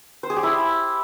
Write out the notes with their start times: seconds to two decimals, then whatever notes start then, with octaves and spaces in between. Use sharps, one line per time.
0.23 C5
0.30 G#4
0.36 G4
0.43 E4